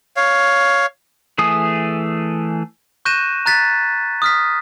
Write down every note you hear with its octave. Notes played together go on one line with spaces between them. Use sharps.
C#5 F5
E3 A3 G#4 D#6
C#6 F#6 G6 A#6 D#7 E7
A#5 F#6 A6 B6
D#6 F6 B6